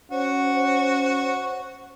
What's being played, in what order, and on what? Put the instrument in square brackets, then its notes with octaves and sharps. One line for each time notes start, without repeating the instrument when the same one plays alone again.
[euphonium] C#4 [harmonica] F#4 [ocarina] C5